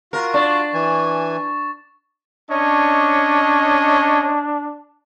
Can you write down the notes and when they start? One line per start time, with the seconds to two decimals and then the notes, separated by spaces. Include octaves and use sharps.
0.13 F4 F#4 A#4
0.34 D4 C#6 A6
0.74 E3 G#5
2.51 C#4 D4 C#5 D#5